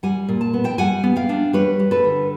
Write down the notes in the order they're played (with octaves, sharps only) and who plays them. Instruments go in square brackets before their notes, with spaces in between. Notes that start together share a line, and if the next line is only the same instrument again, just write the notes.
[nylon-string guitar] G3 F#5 G#5
A#2
A5
B3
G5 A5
G3 F#5 G#5
B3
F5 G5
D4
G3 B4 C#5
G3
A4 B4
D3